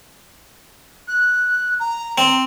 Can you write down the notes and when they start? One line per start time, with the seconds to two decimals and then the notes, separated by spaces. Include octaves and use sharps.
1.08 F#6
1.80 A#5
2.18 C4